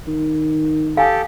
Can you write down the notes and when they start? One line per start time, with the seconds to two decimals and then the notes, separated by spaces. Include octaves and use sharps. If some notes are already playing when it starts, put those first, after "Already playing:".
0.07 D#3
0.97 G4 A4 F5 G#5 D#6